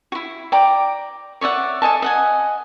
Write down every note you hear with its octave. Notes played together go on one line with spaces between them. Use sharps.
E4 F#4
D5 G5 A#5 D6
C#5 D5 E5 F#5
A4 D#5 G#5 A5
D#5 F#5 G#5